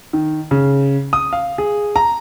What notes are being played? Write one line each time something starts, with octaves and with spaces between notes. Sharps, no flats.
D#3
C#3
D#6
F5
G#4
A#5